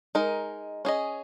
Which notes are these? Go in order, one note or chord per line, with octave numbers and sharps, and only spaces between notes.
G#3 D#4 A#4
C#4 G#4 D#5